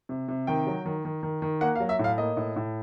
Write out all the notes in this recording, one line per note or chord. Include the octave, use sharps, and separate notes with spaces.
C3
C3
D#3 G5
F#3
D#3
D#3
D#3
D#3
A#3 F#5
F5
F#3
E5
A2
F5
A#3 D#5
A2
A2